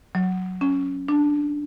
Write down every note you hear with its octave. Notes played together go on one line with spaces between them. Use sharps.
F#3
C#4
D4